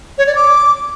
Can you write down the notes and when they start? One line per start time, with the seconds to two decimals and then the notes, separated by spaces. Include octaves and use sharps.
0.18 C#5
0.27 D5
0.35 D6